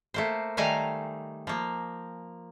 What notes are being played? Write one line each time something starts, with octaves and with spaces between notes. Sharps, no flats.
A3 A#3 C5
D#3 G3 A3 F5 G#5 A#5
F3 A#3